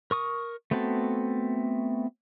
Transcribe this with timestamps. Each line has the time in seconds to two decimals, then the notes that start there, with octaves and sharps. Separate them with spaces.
0.11 A#4 C#6 D#6
0.71 A3 B3 C4 F#4 A4